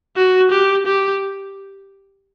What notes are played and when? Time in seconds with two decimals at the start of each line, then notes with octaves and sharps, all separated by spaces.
0.17 F#4
0.51 G4
0.86 G4